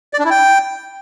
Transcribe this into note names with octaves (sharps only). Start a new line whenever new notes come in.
D5
D4
E4
G5